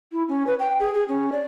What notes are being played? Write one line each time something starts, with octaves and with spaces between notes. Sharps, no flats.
E4
C#4
B4
G5
G#4
G#4
C#4
D5